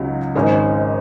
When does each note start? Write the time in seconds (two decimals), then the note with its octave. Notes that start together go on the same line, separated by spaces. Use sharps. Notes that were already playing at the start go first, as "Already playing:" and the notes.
Already playing: C#2 C#3 F#3 D#4
0.35 G#1 G#2 G#3 C#4